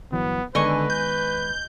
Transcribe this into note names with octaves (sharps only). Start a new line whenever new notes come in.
G1 E3 F#3 B3
D3 D#3 G#3 B3 B4 D#5 G#5 C#6
G6